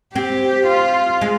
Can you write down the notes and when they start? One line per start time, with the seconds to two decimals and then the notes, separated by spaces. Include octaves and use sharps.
0.15 C4 G4
0.68 F4
1.21 G#3